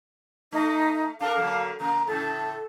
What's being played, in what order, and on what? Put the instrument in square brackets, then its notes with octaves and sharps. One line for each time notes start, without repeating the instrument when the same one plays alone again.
[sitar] A3 [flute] D#4
[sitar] D4 A4 A#4 [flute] F5
[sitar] D3 F#3 A#3
[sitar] C#3 A#3 [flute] A#5
[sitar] A2 C#3 [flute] A4